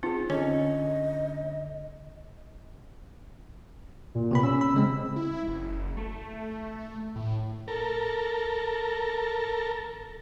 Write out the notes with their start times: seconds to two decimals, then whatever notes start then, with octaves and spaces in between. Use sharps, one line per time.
0.03 C4 D#4 F4 G#4
0.30 D3 C#4 D#5
4.15 A#2
4.31 C3 B3 B5
4.43 C#4 E6
4.61 B5
4.74 C#3 G#3 C4
5.16 E4
5.48 F#1
5.97 A3
7.16 A2
7.68 A4 A#4